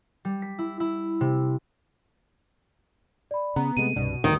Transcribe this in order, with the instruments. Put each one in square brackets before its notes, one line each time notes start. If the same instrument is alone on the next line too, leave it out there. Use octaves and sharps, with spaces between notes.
[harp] G3
B6
E4
E4
C3
[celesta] D5 B5
[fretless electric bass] C#3 [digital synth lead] B3 [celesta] A#5
[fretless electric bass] C3 G#3 A3 [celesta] D#7
[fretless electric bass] C2 G2 D4 [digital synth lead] B2
[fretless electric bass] D2 G2 [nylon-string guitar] D#3 [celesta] D#6